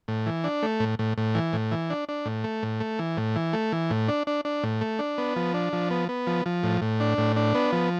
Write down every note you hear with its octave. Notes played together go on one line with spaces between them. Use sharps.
A2
E3
D4
A3
A2
A2
A2
E3
A2
E3
D4
D4
A2
A3
A2
A3
E3
A2
E3
A3
E3
A2
D4
D4
D4
A2
A3
D4
B3
F3
D4
F3
B3
B3
F3
F3
A2
A2
D4
A2
D4
B3
F3